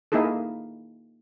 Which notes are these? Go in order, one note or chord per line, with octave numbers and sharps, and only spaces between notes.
A#3 D#4 E4 G#4 A4